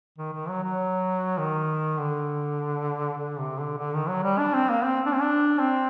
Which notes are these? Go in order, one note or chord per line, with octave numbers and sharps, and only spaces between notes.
D#3
D#3
F#3
F#3
D#3
D3
D3
C3
D3
D3
D#3
F#3
G3
D4
C4
A#3
C4
D4
C4
D4
C4